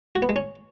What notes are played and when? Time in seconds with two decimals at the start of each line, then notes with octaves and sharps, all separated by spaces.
0.16 F#4
0.22 B3
0.29 G#3
0.36 C#4